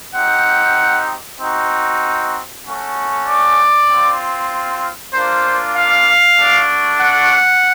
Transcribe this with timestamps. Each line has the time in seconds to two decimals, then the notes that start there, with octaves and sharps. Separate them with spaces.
0.14 C4 D#4 G4 F#5
1.39 C4 D#4 F#4
2.64 A3 C#4 F#4
3.26 D5
3.88 C4 F4
5.13 A#3 D4 F4 C5
5.75 F5
6.38 A3 D4 F#4
6.99 F#5